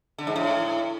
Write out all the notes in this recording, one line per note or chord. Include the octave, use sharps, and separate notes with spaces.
D3
G#2
A2